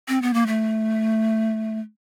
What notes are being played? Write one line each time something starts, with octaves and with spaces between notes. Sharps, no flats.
C4
B3
A#3
A3